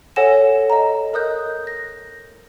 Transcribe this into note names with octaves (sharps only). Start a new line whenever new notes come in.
A4 C#5 F#5 G#5 A#6 E7
D#5 A#5
A#4 D#5 D#6 F#6 G6
A#6